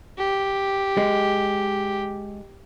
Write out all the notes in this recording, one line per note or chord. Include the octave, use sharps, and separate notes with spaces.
G4
G#3